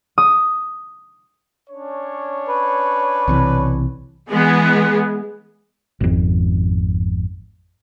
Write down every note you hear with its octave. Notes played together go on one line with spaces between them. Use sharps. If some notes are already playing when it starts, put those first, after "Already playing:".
D#6
C#4 D4 C#5
B4
B1 C3 E3
E3 G#3 B3 G#4
G#1 F2